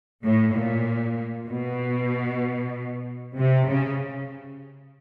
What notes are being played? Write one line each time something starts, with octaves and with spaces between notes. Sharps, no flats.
A2
A#2
B2
C3
C#3